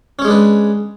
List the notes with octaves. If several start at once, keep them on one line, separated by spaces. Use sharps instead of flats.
G#3 C#4 D4 B4 C#5